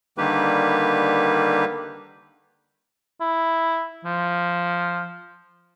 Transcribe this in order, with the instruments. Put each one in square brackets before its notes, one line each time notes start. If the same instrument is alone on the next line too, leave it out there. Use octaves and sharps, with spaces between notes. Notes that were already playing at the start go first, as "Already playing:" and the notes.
[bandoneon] D3 D#3 G3 A#3 G4 B4
[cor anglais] E4
F3